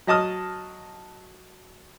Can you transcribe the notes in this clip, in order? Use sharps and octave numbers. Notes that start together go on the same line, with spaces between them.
F#3 D#5 A5 D#6 F6